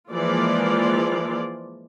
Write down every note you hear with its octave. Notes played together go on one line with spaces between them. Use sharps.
E3 F3 G#3 A#3 F4 D5